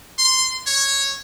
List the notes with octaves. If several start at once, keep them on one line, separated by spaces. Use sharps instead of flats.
C6
C#5